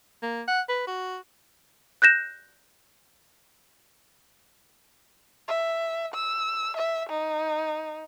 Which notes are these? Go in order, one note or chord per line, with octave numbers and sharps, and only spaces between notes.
A#3
F#5
B4
F#4
F#6 G6 A#6 E7
E5
E6
E5
D#4